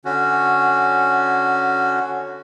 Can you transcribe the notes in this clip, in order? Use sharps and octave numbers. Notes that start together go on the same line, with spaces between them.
D3 C#4 F#4